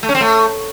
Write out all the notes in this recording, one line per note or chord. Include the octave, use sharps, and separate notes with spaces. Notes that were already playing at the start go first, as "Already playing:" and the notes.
A3
C#4
C4
A3